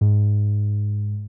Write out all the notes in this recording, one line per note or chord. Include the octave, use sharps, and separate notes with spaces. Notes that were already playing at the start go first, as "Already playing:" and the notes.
G#2